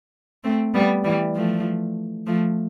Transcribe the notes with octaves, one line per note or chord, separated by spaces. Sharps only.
A3 C4
G3 B3
E3 G3
F3 A3
F3 A3